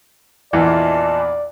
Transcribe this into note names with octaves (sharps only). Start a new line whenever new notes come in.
A#1 E2 E3 F4 D5 D#5 A5